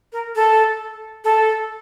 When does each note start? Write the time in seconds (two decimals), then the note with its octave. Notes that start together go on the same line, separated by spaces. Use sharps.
0.13 A#4
0.35 A4
1.24 A4